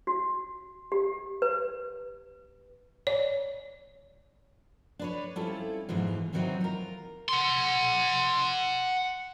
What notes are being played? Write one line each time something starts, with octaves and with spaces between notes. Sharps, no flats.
F#4
G4
B4
C#5 D5
D4 B4 C#5
G3 C4 C#4 E4 F4 A4
F2 G#2 B2 E3 F3
E2 D#3 E3 F#3 C4 D#4
F4 A#4
F#5 C6